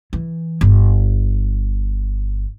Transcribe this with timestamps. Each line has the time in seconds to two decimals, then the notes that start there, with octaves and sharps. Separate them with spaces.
0.13 E3
0.61 G1